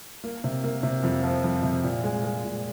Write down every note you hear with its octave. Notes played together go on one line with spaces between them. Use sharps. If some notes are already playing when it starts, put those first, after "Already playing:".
A#3
C3
A#3
C3
F2
F3
F2
C3
A#2
G#3
G#3
A#2